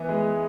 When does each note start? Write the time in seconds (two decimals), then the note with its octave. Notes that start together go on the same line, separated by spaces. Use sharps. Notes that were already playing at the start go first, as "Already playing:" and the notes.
Already playing: E3 B3
0.09 G#3